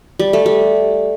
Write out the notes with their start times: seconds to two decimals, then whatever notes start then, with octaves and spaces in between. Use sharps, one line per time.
0.19 G3
0.33 A3
0.46 G3